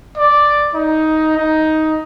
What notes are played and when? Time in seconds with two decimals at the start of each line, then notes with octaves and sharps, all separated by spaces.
0.17 D5
0.74 D#4
1.37 D#4